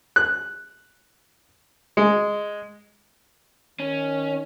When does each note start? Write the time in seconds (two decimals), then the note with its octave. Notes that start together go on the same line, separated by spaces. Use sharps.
0.16 F#6
1.97 G#3
3.80 D#3 C#4